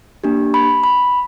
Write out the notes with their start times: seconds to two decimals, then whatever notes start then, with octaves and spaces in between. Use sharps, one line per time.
0.24 A#3 D4 G4
0.54 B5
0.84 B5